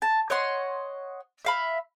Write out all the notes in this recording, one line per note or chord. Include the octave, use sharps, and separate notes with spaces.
A5
C#5 D#5 F#5 C6
E5 F5 B5